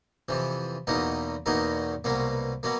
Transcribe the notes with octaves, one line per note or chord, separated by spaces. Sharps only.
F2 C3 E3
E2 B2 F#3 A#3 D#4
E2 B2 F#3 A#3 D#4
C2 B2 F#3 A#3
B2 F#3 A#3